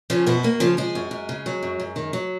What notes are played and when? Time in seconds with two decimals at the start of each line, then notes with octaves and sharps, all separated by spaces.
0.10 C#3 F3 C#4
0.26 F#2 B2 B3
0.43 F#2 A#3
0.60 C#3 F3 F4
0.77 F3 G#3 G#4
0.95 F#2
1.11 F#2
1.29 C#3
1.46 F#3
1.63 F#2
1.80 F#2
1.96 D#3
2.13 F#3